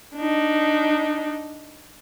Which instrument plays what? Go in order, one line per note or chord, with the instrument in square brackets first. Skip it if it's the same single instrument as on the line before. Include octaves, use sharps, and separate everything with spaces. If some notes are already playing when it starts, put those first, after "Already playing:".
[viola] D4 D#4